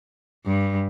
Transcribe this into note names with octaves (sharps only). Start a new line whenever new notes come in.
G2